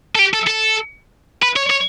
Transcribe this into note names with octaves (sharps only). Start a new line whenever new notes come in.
A4
G4
A4
A4
B4
C#5
C#5